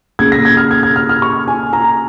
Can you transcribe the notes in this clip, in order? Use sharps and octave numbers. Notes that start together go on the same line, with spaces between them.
A#3 C#4 G#4 G#6
A#6
G#6
F6
G#6
G#6
F6
F6
C#6
G#5
A#5